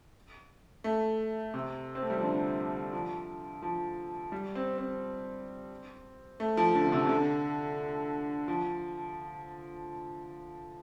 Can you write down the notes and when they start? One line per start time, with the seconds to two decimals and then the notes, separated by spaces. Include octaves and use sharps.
0.84 A3
1.54 C3
1.95 C4
2.02 A3
2.10 G3
2.17 F3
2.23 D3
2.93 F3
3.62 F3
4.32 G3
4.55 C4
4.78 C4
6.40 A3
6.57 F3
6.75 D3
6.87 D3
6.92 C3
7.05 C3
7.09 D3
8.48 F3